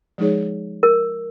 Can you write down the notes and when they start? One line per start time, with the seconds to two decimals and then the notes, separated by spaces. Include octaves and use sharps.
0.18 F3 G#3 D#4 G#4 C#5
0.83 A#4